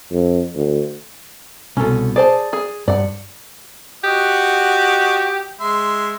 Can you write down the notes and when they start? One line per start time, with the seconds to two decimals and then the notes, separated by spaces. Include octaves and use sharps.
0.12 F2
0.55 D2
1.77 C2 B2 C#4 A4
2.16 G#4 C5 D5 A5
2.53 G#4
2.88 G2 D5 F#5
4.04 F#4 G4 D#5 F#5
5.60 G#3 E5 C6